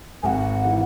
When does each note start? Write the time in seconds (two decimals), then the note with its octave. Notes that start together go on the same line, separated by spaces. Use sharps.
0.23 G#1 F#5 G#5
0.65 E3